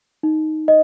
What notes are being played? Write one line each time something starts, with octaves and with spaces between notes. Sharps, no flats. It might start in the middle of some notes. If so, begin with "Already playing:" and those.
D#4
D#5